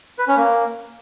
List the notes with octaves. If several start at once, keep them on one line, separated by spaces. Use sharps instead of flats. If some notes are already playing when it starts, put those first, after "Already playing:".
B4
C#4
A#3